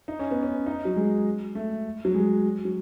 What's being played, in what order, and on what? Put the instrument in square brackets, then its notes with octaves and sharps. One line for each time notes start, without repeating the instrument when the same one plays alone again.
[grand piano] D#4
C#4
B3
C#4
D#4
F#3
G#3
A3
F#3
G#3
F#3